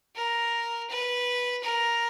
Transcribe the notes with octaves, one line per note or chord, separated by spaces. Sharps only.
A#4
B4
A#4